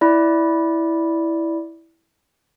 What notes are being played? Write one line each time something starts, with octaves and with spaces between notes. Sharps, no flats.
E4 D5